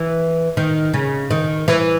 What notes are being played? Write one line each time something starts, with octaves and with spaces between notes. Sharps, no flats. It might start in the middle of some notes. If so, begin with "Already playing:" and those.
Already playing: E3
D#3
C#3
D#3
E3